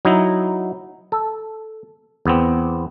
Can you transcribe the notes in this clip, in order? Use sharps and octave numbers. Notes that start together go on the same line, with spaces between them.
F#3 D#4 E4
A4
E2 B3 C4